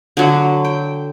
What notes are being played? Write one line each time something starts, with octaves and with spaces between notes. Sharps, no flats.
D3 F#3
G5